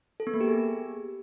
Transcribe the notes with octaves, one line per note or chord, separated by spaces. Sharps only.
A4
B3
A#3
G4
G#4